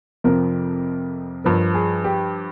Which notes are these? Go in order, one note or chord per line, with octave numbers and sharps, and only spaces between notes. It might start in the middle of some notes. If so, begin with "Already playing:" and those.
F2 C3 F3 A#4
G2 F3 A#4
G#4
G4